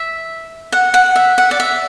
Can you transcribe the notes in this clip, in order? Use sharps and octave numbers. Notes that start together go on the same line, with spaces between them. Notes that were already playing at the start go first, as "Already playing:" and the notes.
Already playing: E5
F#5
F#5
E5
F#5
D5
E5